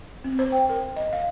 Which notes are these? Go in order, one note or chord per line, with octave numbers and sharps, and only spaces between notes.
C4
C5
G5
A#4
D#5
F5